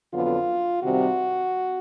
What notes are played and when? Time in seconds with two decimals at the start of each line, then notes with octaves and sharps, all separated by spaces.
0.12 F2 D3 F#3 B3 F4
0.83 C3 D#3 G3 C4 F#4